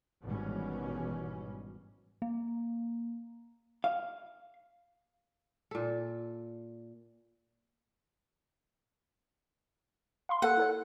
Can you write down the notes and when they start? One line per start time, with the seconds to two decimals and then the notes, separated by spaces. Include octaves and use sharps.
0.23 G#1 G#2 B2 E3 G3 C#4
2.22 A#3
3.84 F5
5.71 A#2 A4
10.29 F5 B5 C6
10.42 A#3 A4 F#5
10.57 E4 A4 C#5